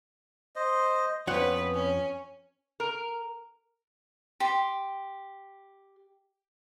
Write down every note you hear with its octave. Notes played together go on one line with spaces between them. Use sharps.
C5 D#5
F2 B3 C#4 B4 C#5 F#5
C#4
A#4
G4 C6